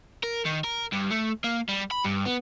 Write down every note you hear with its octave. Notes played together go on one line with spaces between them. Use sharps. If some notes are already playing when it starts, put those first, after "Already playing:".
A#4
D#3
A#4
G2
A3
A#3
G3
B5
G2
B3